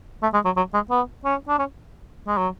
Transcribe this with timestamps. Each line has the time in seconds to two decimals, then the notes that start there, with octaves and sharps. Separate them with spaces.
0.23 A3
0.34 G#3
0.45 F#3
0.57 F#3
0.74 G#3
0.91 B3
1.25 C#4
1.48 D4
1.59 C#4
2.28 G#3
2.38 F#3